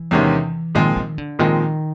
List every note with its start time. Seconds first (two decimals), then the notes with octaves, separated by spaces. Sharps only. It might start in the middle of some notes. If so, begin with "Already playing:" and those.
Already playing: E3
0.11 E2 C3 D#3 G#3 C#4
0.75 A#2 D#3 F3 G#3 C4
0.96 D#3
1.18 D3
1.39 A#2 D#3 F3 G#3 C4